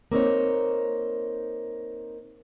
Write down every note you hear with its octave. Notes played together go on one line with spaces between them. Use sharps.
A#3 C4 D#4 C#5